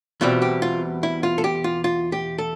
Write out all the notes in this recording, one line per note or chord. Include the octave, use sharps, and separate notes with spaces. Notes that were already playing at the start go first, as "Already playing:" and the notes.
E2 B2 G3 C4 F4
G4
F4
E4
F4
A4
G4
F4
F4
G4
A4